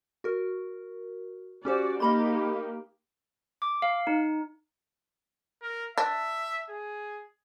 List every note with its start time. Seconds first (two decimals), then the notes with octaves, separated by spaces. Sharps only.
0.24 F#4 A#4
1.65 C#4 F#4 G4 C5 D5
2.00 A#3 D#4 G4 D#5 B5 C6
3.62 D6
3.82 F5
4.07 D#4
5.62 A#4
5.98 D4 E5
6.70 G#4